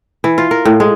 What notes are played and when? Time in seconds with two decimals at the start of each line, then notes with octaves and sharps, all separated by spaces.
0.24 E3
0.38 F4
0.51 A#4
0.65 A2
0.80 G#3